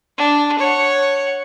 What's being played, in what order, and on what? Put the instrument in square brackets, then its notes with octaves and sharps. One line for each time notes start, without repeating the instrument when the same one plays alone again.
[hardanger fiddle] D4
C#5 F#5